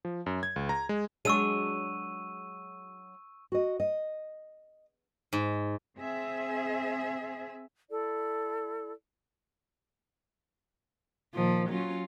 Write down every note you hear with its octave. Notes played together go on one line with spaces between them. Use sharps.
F3
F#2
G#6
C#2
A#5
G#3
F#3 G#3 D4 C#6 E6 D#7
F#4 D#5
D#5
G#2
C4 G#4 E5
E4 A4 D5
A#2 D#3 F3
F#3 C#4 F4